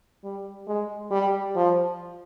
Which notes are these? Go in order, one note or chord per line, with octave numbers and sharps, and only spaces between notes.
G3
G#3
G3
F3